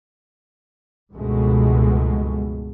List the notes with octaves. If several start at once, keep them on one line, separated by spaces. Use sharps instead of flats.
C#2 G2 B2 F3 G#3 A3